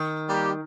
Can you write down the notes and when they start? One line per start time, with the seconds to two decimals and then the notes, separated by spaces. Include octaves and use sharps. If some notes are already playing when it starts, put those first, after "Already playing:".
Already playing: D#3
0.28 G3 A#3 G4